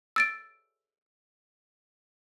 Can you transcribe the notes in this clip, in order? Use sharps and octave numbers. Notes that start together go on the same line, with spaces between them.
E6 A6 D7